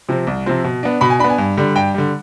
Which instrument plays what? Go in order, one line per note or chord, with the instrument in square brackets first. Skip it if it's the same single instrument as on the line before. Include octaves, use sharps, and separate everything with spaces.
[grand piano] C3 F3 C4
C2
C3 F3 C4
B2
B3 D4
B2 B5
G#5
D4 B5
B3
G#5
G2
D3 G3
G2 G5
D3 G3